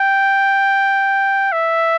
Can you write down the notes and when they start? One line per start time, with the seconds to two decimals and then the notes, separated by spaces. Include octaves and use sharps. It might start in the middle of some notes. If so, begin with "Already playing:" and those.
Already playing: G5
1.52 E5